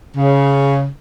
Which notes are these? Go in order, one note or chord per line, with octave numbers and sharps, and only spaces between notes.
C#3